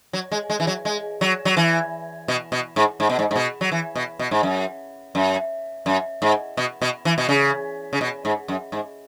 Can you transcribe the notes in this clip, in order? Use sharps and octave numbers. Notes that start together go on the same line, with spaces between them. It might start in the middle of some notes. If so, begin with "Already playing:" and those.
F#3
G#3
G#3
E3
F#3
G#3
F#3
F#3
E3
B2
B2
G#2
G#2
B2
G#2
G#2
B2
F#3
E3
B2
B2
G#2
F#2
F#2
F#2
G#2
B2
B2
E3
B2
C#3
C#3
B2
G#2
F#2
G#2